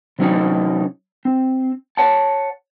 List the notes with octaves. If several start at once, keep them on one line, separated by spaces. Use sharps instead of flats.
C3 F#3 C#4 D#4
C4
C#5 F#5 A5